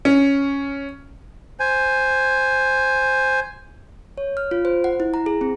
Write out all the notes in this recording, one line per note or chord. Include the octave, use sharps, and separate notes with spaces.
C#4
C5 G#5
C#5
F6
F4
C5
F#5
E4
A#5
G#4
C4